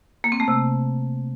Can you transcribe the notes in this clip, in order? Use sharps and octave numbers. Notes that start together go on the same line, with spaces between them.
A#3
C4
A3
C3